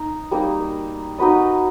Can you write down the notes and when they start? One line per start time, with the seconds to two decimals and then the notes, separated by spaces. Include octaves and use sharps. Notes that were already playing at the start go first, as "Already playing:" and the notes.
Already playing: D#4
0.31 G3 A#3 D#4
1.18 D#4 F#4 B4 D#5